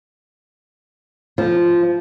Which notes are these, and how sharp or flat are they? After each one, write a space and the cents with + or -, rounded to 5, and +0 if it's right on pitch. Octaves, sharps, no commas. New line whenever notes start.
F3 -10